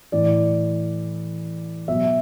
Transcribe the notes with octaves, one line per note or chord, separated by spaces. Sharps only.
A2 E3 D5
B2 F#3 E5